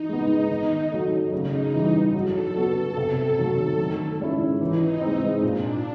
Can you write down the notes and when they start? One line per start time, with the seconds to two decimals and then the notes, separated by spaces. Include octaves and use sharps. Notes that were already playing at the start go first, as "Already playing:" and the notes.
Already playing: E3 D#4
0.09 G#3 B3
0.50 D#3
0.91 F#3 A3
1.32 C#3 D#4
1.73 E3 G3
2.14 F#3 A4
2.56 B3 D4 F#4
2.97 C3
3.38 D#3 F#3 A3
3.78 D#3
4.20 G#3 C#4 E4
4.61 E3 D#4
5.02 G#3 C4
5.43 A#2 D4